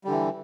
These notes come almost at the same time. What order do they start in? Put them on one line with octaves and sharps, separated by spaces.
G3 D3 E3